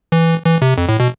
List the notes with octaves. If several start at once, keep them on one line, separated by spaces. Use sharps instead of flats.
E3
E3
C3
F2
A2
B2